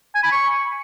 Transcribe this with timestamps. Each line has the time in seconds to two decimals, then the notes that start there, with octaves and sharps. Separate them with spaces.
0.15 G#5
0.23 B5
0.32 C#6